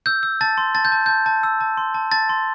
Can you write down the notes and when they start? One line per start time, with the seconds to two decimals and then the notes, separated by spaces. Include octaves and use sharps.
0.06 E6 G6
0.23 E6
0.41 A5 A6
0.58 C6
0.75 A5 A6
0.85 G6
0.92 A5
1.06 A5 G6
1.26 A5
1.43 E6
1.60 A5
1.77 C6
1.94 A5
2.12 A5 A6
2.29 C6